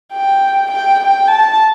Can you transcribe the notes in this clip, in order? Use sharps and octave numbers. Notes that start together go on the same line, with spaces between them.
G5
G5
G5
A5